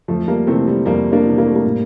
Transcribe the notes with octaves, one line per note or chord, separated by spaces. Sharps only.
F2 F3 A3
G3 A#3
C3 E3 A3 C4
G3
F2 G3 A#3
A#3 D4
C3 E3
A#3
A3
G3 A#3
A2